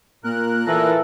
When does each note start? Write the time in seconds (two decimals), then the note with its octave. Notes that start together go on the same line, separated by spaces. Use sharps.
0.24 A#2 A#3 A#4 F#6
0.67 E3 A4 A#6